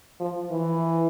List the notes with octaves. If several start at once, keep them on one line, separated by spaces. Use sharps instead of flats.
F3
E3